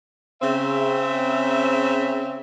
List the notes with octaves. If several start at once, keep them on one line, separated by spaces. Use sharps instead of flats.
C#3 C4 E5